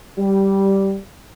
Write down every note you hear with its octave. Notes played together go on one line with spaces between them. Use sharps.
G3